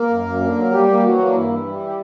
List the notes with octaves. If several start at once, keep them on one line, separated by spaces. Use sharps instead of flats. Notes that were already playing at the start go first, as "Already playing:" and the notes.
Already playing: A#3 A#4
F#2
F#2
D3
F#3
G3 A#3 G4
A#3
E3 F#3 F#4
A#3
D4
G2 E3 E4
E3
G3
G4